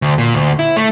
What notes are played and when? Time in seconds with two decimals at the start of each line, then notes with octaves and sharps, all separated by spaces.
0.02 D2
0.18 A#2
0.34 D2
0.59 E4
0.77 A3